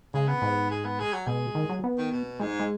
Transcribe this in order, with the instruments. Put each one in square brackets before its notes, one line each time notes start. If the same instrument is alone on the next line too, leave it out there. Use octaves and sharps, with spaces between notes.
[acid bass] C#3 [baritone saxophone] G#3
[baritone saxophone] B3
[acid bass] G#2
[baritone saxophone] G#3
B3
G#3
F#3
[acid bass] B2 [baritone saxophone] G#3
[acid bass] D#3
F#3
B3
[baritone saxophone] D#3
B2
[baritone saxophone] G#2 [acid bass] G#3
[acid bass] G#3